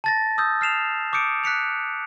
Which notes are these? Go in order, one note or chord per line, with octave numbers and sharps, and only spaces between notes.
A5 A6 A#6
D#6 E6 G6
F6 C7 E7 F7
D6 D#6 G6 C#7 D7
F#6 B6 C#7 F7